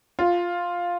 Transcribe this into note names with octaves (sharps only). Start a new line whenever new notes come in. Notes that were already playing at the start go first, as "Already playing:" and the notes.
F4